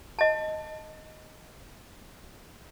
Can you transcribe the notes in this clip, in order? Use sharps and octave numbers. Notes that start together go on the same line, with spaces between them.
D#5 A5